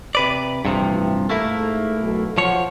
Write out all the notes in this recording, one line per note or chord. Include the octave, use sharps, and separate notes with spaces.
C3 B4 D5
A1 G2 C3 E3 F3
G#2 A3 A#3 E4 A4
B1
F3 C5 C#5 F#5